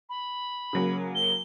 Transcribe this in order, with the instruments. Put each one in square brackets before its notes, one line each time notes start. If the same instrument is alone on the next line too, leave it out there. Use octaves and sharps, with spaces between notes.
[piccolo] B5
[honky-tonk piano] C#3 F#3 A#3
[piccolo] G7